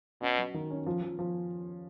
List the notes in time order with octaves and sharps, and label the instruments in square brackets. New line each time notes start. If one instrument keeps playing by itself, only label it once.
[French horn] B2 [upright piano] C#4
[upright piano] F#3
D#3
C#4
F3
F3
F3